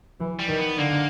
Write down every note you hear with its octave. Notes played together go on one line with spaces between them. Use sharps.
E3
G3
D#3
B3
D3 A#3